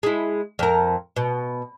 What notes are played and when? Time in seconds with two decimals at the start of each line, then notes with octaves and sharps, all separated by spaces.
0.03 G#3 E4
0.59 F2 A#4
1.16 B2